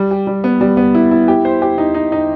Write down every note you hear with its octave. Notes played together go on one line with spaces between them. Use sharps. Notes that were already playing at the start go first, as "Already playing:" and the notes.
Already playing: G3
G4
G3
B3
G3
B3
E4
E4
G4
C5
G4
D#4
D#4
D#4